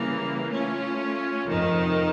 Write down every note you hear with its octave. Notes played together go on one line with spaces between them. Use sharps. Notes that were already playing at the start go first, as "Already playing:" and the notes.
Already playing: C#3 E3 G3 A#3
A3 C#4 F4
F2 C3 D#3